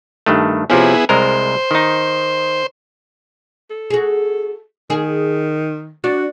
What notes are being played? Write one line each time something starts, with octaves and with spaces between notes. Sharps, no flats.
G2 D#3 A3
C3 F3 B3 C#4 E4 G#4
C2 G#3 A#4 C5
D#3 D#4
A4
F#4 G#4
D#3 G#4
D4 F#4